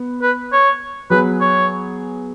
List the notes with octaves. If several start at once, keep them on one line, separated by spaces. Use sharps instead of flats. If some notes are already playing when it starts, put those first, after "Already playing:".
Already playing: B3
B4
C#5
F#3 B3 G#4 B4
C#5